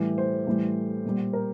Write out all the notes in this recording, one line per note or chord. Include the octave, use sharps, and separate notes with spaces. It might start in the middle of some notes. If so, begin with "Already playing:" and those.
Already playing: A2 E3 G3
C5
A2 E3 G3
A#2 G3
A#4